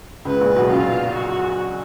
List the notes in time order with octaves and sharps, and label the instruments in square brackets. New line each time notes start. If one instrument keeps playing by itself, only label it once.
[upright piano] C#2 C#3 [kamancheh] B4
[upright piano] A#1 A#2
B1 B2
[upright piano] F#2 [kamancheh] F4
[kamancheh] F#4